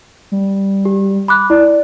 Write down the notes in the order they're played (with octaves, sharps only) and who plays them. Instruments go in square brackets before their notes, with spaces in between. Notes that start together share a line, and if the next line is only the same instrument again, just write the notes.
[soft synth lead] G3
[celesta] G4
B5 D6 F#6
[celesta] E4 [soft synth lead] D5